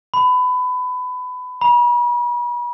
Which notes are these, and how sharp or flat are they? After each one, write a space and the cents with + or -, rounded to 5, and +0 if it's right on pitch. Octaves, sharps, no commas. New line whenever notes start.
B5 +25
B5 -40